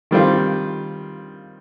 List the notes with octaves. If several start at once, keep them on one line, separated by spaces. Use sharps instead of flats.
D#3 G3 C4 F4